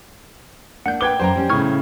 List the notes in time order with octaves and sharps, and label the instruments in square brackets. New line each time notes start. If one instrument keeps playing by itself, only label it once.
[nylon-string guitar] A#3 D4 [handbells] F#5 G6
[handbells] B4 D6 [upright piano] G5 G#6 G7
[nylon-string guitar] F#2 [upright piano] C5 G5 A#5
[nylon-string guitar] G3 C#4
[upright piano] A2 C#3 [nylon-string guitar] D#4 [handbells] C#6 F6 G#6